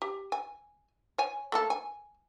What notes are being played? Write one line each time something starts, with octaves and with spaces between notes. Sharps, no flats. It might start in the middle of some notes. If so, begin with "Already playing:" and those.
G4
G#5
C#5 G#5
A3 A#3 A4
G#5